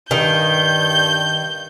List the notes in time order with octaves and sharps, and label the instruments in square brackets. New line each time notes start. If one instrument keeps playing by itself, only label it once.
[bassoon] G2 [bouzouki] D#3 [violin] G6